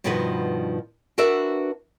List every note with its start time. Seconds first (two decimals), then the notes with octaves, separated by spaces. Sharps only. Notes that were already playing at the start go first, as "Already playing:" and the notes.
0.04 G2 B2 D#3 F3 F#4 B4
1.18 D4 F#4 A#4 B4 E5